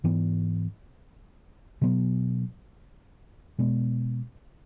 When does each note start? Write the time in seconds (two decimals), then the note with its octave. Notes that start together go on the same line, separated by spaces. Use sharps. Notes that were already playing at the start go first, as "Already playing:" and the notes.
0.04 G#2 E3 B3
1.81 B2 F#3 B3
3.58 B2 G#3 B3